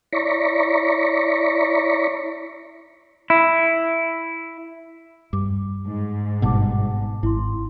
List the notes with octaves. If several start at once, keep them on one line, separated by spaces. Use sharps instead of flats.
E4 C#5 D5 A#5 B5 C#6
E4
G2 D6
G#2
G#1 G2 B2 F#5 A5 D6
G#1 E4 C6